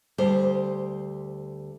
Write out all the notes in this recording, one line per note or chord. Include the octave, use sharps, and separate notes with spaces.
D2 G3 C5